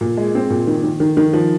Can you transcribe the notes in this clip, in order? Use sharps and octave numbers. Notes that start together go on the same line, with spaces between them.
A#2
G#3
C4
A#2
D#3
D#3
D#3
D#3
F3